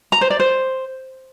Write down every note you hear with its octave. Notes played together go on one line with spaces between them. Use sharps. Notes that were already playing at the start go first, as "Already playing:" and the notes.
A#5
C5
D5
C5